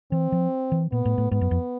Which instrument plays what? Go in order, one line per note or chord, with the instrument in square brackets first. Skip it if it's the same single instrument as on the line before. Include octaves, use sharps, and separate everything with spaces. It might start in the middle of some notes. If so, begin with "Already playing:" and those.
[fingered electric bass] E3 [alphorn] C4
[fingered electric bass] F3
E3
[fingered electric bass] A#2 [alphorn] B3
[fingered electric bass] A2
A2
[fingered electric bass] G#2 [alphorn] B3
[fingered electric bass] F#2
F2